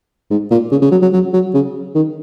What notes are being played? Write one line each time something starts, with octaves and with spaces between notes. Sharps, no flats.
G#2
A#2
C#3
C#3
F#3
F#3
F#3
F#3
C#3
D#3